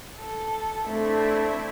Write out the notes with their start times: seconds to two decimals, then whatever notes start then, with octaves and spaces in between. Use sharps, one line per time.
0.18 A4
0.87 A3 C4 D4 E4